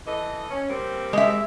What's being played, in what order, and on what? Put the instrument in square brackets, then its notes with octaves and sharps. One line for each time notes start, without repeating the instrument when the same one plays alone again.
[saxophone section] E3 A4 D#5
C#4
G3 A#3 C4
[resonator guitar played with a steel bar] G#3 E5